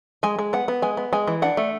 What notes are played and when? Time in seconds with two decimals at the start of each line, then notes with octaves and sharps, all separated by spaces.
0.23 G#3 G#5
0.39 G#3
0.53 B3 F#5
0.68 B3
0.82 G#3 G#5
0.97 B3
1.13 G#3 G#5
1.27 E3
1.42 D4 F#5
1.57 A3